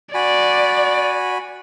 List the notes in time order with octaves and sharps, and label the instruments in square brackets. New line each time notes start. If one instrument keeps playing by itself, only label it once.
[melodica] F#4 G#5 B5 [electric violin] D5